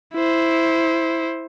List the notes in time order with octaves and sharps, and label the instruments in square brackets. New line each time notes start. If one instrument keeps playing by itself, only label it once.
[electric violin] E4 C5